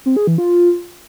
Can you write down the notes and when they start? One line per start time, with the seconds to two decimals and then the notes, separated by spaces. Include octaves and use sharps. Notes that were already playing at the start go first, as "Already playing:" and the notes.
0.06 C4
0.16 G#4
0.27 E3
0.38 F4